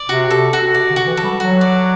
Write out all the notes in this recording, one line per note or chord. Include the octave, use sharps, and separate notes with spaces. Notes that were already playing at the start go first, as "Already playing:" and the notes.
Already playing: D5
C3 F#4
A4
F#4
C3 D5
D3
F#4
E3
A4
G3
F#3 F#4
D5